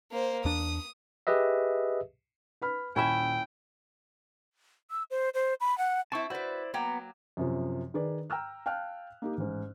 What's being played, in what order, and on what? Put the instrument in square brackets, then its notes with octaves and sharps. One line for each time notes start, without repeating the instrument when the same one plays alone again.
[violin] A#3 C5
[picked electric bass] E2 D4 [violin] D#6
[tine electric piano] G4 G#4 B4 D#5 E5
[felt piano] B4 B5 F6
[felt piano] D#1 G#5 [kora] C#4 E4 E5 [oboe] G5
[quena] E6
C5
C5
B5
F#5
[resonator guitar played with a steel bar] C4 E4 [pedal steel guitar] A5 C#6
[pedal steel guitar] E4 C5 D5 [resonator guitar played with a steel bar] F#4 B4
[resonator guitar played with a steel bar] F#3 A#3 G5 [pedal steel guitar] B3 A#5
[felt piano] F#2 C3 F3
D#3 G#4 B4 D5
G5 A#5 E6 F6
F5 G5 A5 F6 F#6
A#3 D#4 G4
A1 G#2